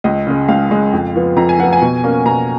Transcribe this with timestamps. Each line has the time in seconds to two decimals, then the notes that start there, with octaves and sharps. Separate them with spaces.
0.04 C#2 D#5
0.27 C#3 G#3
0.48 C#2 F5
0.70 C#3 G#3
0.93 F2
1.16 F3 B3
1.36 F2 A#5
1.49 G#5
1.59 F3 B3 F#5
1.73 G#5
1.82 B2
2.04 A#3 C#4
2.25 B2 A#5